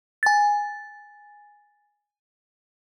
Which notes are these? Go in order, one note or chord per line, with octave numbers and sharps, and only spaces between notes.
G#5 A6